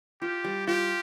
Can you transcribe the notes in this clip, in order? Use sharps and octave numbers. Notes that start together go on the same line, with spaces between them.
F4 G4
G3
F4 G4